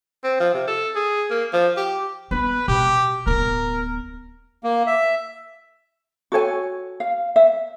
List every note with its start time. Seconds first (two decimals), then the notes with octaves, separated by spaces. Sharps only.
0.24 C4
0.40 F3
0.54 C3
0.68 A4
0.95 G#4
1.31 A#3
1.53 F3
1.77 G4
2.31 B3 B4
2.68 B2 G4
3.27 D1 B3 A#4
4.64 A#3
4.86 E5
6.32 F#4 A4 C#5 G#5
7.00 F5
7.36 E5